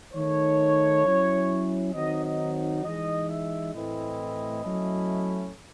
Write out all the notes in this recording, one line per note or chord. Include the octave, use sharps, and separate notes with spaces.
D#3 A3 D#4 C#5
F#3 C#4 E4
D#3 F#3 C4 D#4 D#5
D#5
E3 G#3 D#4 D#5
E5
A2 E3 A3 C4 E4 D#5
F#3 A3 C#4 E4